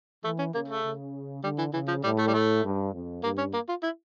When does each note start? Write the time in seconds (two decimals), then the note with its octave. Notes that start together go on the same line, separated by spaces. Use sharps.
0.24 E3 A3
0.39 C#4
0.54 C#3 A#3
0.68 A3
0.84 C#3
1.43 D3 G3
1.58 E3
1.73 C#3 E3
1.88 F3
2.04 A2 G3
2.18 A3
2.28 G3
2.34 A3
2.64 G2
2.93 F2
3.23 G2 A#3
3.38 C#4
3.53 A#3
3.69 F4
3.83 E4